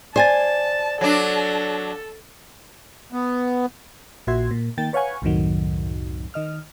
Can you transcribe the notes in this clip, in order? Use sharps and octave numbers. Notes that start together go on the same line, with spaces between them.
C5 D5 G#5 A5 A6
F#3 D4 A4
B3
A#1 A#2 F#4 E5 C6 G#6
A#2
D#3 A#3 G5 A6
B4 C#5 F5 F#5 G#5 C#6
C2 F#2 A2 C3 D#3 F#3
D#3 D#5 F6